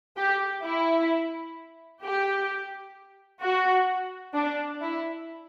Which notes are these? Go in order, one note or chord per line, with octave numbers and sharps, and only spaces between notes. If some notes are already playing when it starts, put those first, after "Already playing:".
G4
E4
G4
F#4
D4
E4